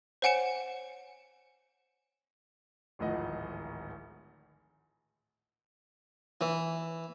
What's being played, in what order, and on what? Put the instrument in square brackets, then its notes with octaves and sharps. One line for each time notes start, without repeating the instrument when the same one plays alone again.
[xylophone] C5 C#5 F#5 G#5 C#7 E7
[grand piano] D1 G#1 A2 F3 D#5 F#5
[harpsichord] E3